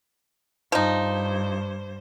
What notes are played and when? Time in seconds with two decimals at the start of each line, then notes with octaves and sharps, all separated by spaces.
0.72 G2 F3 D#4 C5